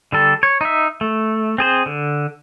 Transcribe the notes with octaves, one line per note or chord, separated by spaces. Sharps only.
D3 G3 A4
C#5
D#4 E5
A3
C4 G#4 C5
D3